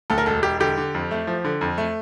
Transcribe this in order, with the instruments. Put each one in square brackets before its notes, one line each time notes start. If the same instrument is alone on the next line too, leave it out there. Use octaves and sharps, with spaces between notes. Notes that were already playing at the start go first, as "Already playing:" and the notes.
[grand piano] D2 A4
A#4
E1 A4
E1 G4
D3 G4
D3
F2
A3
F3
D3
F2
A3